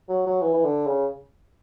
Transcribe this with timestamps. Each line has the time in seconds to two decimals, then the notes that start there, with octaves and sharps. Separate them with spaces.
0.09 F#3
0.26 F#3
0.42 E3
0.54 E3
0.64 D3
0.86 C#3